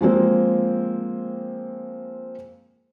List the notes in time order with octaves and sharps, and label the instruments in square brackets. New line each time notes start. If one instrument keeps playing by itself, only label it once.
[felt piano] F3 G#3 A#3 C4